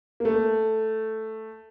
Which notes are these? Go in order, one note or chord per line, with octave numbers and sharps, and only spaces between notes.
A#3
A3